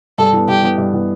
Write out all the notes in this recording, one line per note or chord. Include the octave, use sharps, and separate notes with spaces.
G2 A4
E3 B3
G2 G4
E3 B3
G2
E3 B3